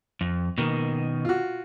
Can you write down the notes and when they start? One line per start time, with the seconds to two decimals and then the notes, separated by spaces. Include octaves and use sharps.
0.21 F2
0.58 B2 D#3 A#3
1.25 F4 F#4